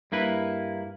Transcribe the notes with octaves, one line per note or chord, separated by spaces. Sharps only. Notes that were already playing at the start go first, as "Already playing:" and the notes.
G2 A#3 E4 B4